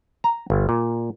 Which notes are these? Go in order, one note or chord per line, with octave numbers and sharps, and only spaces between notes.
A#5
G1
A#2